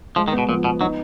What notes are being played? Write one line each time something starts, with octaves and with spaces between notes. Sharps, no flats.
F3 G#3
D#3
B3
B2
A#2 F3
B2 B3
F#3 D#4